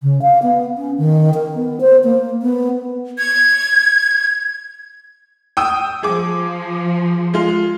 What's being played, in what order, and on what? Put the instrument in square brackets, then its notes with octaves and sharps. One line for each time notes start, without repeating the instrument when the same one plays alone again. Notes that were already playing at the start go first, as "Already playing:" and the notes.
[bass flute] C#3
F5
B3
C#4
D#3
A#4
B3
C5
A#3
B3
[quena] G#6
[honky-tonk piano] G5 D#6 E6
[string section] F3 [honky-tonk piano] G#4 D6
[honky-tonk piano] G#3 F4